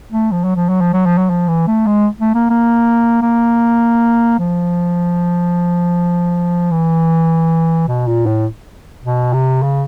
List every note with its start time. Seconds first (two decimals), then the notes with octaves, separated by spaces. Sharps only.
0.12 A3
0.32 F3
0.44 F#3
0.56 F3
0.69 F#3
0.81 F3
0.93 F#3
1.06 F3
1.18 F#3
1.30 F3
1.48 E3
1.67 A3
1.87 G#3
2.21 A3
2.35 A#3
2.50 A#3
3.22 A#3
4.39 F3
6.71 E3
7.88 B2
8.07 A#2
8.26 A2
9.04 B2
9.33 C3
9.63 C#3